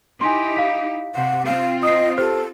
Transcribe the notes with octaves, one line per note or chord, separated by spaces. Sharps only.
D#4 E4 G4 G#5 C6
F5 B6
C3 C5 F#5
C4 F4 F5
D#5 D#6 C7
G4 A4 C5